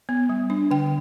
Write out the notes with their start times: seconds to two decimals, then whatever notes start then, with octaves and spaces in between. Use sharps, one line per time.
0.09 B3
0.29 G3
0.50 D4
0.71 D3 G5